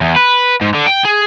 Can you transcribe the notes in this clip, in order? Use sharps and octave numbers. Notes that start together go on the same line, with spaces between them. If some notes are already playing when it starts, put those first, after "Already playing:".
E2
B4
G#2
D3
G5
G#4